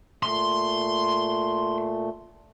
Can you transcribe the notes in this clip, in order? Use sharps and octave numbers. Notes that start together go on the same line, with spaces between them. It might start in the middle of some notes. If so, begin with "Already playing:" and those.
A#2 A3 C6